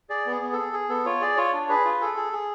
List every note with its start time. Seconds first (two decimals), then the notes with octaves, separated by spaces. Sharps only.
0.10 G#4 D5
0.26 B3
0.31 G#4
0.41 B3
0.53 G#4 A4
0.73 G#4
0.89 B3 A4
1.06 F4 C#5
1.21 G#4 D5
1.37 F4 C#5
1.53 D4
1.69 G#4 B4
1.85 F4
2.01 G#4 A4
2.17 G#4
2.33 G#4